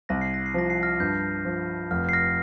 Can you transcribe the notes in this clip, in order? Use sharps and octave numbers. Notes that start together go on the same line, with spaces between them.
C2 A#6
C7
A#6
C7
F3 A#6
C7
F6 A#6
G2 G6
F3
F1 F6
C7
F6 A#6